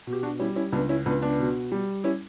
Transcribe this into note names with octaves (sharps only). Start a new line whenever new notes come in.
B2
G4
D4 F#4
G3 C#4 E4
C#4 E4
C#2 B3 D4
C#4 E4
C#2 B3 D4
B3 D4
B2
G3
C#4 E4